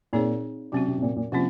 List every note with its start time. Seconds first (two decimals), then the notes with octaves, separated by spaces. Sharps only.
0.13 A#2 C4 D#4 G#4 C#5
0.72 C3 F#3 C#4 F#4
0.88 C3
0.98 C3
1.02 A#2
1.16 A#2
1.32 C3 F3 A#3 C#4 F4